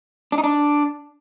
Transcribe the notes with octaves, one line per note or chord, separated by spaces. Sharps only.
D4
D#4
D4